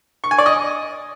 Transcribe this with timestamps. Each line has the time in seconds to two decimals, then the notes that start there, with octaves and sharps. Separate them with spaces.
0.24 C#6
0.31 G#5
0.38 D5
0.46 D#5